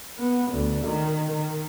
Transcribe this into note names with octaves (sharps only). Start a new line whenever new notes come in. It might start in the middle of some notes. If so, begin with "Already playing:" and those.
B3
D2
D#3
D#3